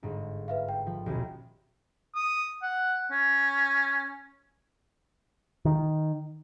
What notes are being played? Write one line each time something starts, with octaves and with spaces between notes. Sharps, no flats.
G1 G#2
B4 E5 F5
G5
F3
D#1 B1 G4
D#6
F#5
C#4
D#3